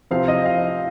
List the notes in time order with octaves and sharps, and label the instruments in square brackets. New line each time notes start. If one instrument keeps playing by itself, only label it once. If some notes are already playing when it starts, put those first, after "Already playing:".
[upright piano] C3 F3 C4 F5
D#5
F5